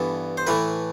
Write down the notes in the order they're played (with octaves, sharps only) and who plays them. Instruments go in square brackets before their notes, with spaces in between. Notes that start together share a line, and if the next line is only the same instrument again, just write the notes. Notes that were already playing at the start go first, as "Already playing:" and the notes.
Already playing: [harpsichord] G2 E3 B3 A4
C5
A2 E3 A3 B4